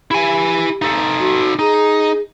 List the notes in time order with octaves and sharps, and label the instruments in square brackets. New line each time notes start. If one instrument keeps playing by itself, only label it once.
[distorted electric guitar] E4 G#5 [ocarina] G4
[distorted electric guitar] D#4 A4
[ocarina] F#4
[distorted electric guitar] D#4 [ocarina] G#4